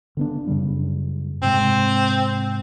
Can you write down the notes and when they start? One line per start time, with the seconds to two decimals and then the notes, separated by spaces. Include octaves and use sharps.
0.17 D3 B3 D4
0.47 F#2 C#3 G3
1.42 G#2 C3 G#3 C4